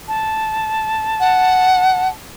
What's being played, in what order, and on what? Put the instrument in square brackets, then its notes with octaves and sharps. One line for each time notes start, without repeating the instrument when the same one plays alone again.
[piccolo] A5
[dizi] F#5